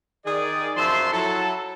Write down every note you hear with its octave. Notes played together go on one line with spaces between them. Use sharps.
D#3 G#4 D5
F#2 F3 E5 A5 C6
F#3 E4 A4